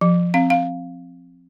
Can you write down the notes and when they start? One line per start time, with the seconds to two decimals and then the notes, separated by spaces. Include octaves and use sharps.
0.01 F3
0.34 C4 F5
0.50 F5